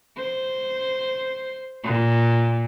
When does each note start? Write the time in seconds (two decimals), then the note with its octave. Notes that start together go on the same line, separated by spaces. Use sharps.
0.17 C5
1.84 A#2